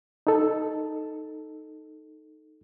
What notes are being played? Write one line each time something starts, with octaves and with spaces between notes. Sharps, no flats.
D#4 A4